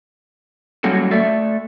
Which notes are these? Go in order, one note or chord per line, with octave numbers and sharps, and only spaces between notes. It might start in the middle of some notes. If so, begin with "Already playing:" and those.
F#3 G3 A#3 C#4 F#4 A4
A3 A4 D5 E5